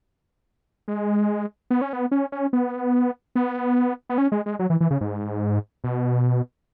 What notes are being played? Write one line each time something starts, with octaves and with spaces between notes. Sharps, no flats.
G#3
B3
C#4
B3
C#4
C#4
B3
B3
B3
C#4
G#3
G#3
F#3
E3
E3
C#3
G#2
B2